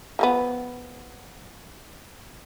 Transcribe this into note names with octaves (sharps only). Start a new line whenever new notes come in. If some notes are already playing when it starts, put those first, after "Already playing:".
F3 A#3 B3